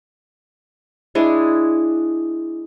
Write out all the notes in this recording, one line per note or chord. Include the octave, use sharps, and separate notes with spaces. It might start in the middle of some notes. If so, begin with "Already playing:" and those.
G#3 D4 E4 G#4